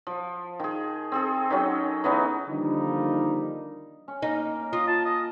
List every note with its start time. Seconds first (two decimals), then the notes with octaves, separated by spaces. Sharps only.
0.07 F3
0.59 D#3 G#4
1.12 C4 G#4 A4
1.50 D#3 F#3 C#4
2.04 E3 B3 C#4 D#4
2.49 D3 D#3 F3 G3 A#3 D#4
4.08 C#4
4.22 A#3 D#4
4.73 F4 D#5
4.88 A5
5.05 D#5